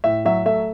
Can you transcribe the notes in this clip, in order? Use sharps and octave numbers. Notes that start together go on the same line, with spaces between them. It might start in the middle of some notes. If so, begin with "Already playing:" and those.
A2 E5
F#3 E5
A3 E5